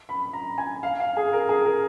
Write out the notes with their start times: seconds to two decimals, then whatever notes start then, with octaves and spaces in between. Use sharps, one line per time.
0.09 B5
0.33 A#5
0.58 G#5
0.83 F5
1.00 F5
1.17 G#4
1.33 A#4
1.49 G#4
1.66 A#4